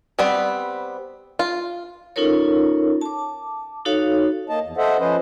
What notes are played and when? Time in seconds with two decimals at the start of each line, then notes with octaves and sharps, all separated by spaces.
0.19 G3 B3 C4
1.39 F4
2.16 C#4 D#4 F4 A4 A#4 C#5
3.01 A5 D6
3.85 D#4 F#4 A4 C#5 F5
4.49 A#3 D#5 A5
4.63 E2
4.77 A4 C5 D#5 E5 F#5
4.99 F3 C#4 B4 C5 D#5